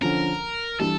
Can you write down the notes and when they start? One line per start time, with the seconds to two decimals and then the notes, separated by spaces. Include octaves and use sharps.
0.01 D3 F3 C#4 A#4
0.79 E3 G3 D4 A4